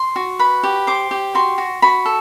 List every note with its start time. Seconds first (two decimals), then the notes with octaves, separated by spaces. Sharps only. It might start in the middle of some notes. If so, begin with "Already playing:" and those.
Already playing: C6
0.16 F#4
0.39 B4 B5
0.63 G4
0.87 C5 D6
1.11 G4
1.35 F#4 C6
1.58 F#4
1.82 F#4 B5
2.05 A4